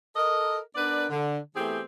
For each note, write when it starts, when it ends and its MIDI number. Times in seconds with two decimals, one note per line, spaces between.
0.16 0.58 69
0.16 0.58 70
0.16 0.58 75
0.75 1.05 59
0.75 1.05 62
0.75 1.05 70
0.75 1.05 71
0.75 1.05 74
1.10 1.38 50
1.56 1.81 52
1.56 1.81 57
1.56 1.81 59
1.56 1.81 60
1.56 1.81 67
1.56 1.81 68